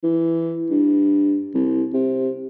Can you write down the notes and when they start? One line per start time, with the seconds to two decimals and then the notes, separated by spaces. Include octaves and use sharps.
0.04 E3
0.70 G2
1.55 C2
1.94 C3